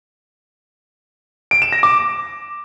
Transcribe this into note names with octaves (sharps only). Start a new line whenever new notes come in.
D7
E7
A#6
D6